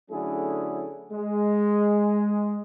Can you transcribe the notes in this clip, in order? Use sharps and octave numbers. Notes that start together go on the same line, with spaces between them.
D3 F#3 A3 C#4 E4 G#4
G#3